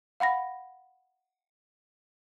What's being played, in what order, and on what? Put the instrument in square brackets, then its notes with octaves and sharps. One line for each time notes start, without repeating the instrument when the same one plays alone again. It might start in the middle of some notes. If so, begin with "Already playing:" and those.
[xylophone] F5 F#5 B5 A#6